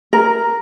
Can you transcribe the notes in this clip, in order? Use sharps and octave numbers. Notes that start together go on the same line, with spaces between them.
A#4